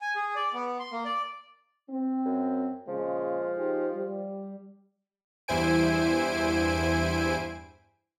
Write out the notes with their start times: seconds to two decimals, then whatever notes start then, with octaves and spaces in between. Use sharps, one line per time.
0.01 G#5
0.16 G#4
0.35 D5
0.54 B3
0.80 C6
0.92 A#3
1.05 D5
1.89 C4
2.25 F#2
2.88 A#2 C#3 F3 G#3
3.55 D#4 G4 G#4
3.94 G3
5.48 E2 G2 E4 C5 G#5 D7